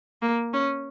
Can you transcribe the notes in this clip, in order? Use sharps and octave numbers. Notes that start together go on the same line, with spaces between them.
A#3
C#4